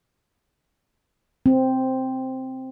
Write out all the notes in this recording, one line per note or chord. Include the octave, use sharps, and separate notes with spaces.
C4